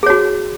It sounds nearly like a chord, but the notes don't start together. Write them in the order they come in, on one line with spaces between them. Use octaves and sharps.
G#4 C#5 F#4